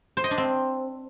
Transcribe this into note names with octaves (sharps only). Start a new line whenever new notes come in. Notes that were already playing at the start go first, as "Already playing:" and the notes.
C5
D#5
D4
C4